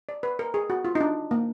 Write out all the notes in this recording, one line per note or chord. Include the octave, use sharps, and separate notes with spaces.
D5
B4
A#4
G#4
F#4
F4
D#4
D4
A#3